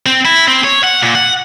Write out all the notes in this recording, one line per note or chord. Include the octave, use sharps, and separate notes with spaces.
C4
E4
C4
C#5
F#5
A#2
F#5